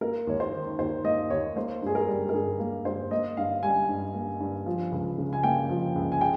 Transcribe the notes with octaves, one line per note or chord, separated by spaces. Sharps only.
A#3 A#4
D#2 C#5
C5
D#3
D#2 C5
A#3 D#5
D#2 C#5
A#3 C5
G2 G#4
A#4
G3
A#4
G2 G#4
A#3
G2 C5
A#3 D#5
G2 F5
G3 G#5
G2
A#3
G2
F3
C#2
C#3
G#5
A#3 G5
F3
C#2
G#5
G#3 G5